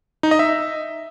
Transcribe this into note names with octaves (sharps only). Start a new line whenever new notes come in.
D#4
D#5
E5